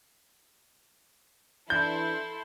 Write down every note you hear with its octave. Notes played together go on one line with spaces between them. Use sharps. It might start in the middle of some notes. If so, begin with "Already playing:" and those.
E3 D4 E4 A4 C6 G6